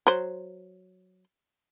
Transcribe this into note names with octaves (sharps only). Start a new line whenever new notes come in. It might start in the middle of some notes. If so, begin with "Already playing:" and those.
F#3 C5